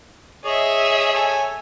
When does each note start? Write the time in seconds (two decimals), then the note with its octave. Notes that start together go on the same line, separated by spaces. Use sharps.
0.45 G#4 C#5 D#5 E5
1.14 A4 C#5 G#5